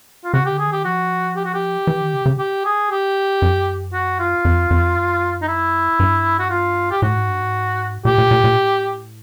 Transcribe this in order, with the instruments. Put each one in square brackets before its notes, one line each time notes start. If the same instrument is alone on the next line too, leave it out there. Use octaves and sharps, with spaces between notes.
[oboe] F4
[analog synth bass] C#3 [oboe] F#4
[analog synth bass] D3 [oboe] G4
[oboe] G#4
[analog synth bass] D#3
[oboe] G4
[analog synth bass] F3 [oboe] F#4
[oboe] G4
F#4
G4
[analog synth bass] E3
D#3
C#3
C#3
[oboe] G4
G#4
G4
[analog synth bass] F#2
[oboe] F#4
F4
[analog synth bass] F2
F2
F#2
[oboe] D#4
E4
[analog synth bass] G2
[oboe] F#4
F4
G4
[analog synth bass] A2 [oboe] F#4
[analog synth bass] G#2
G2
G#2
[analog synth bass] A#2 [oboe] G4
[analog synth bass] A#2
A#2
A#2
A2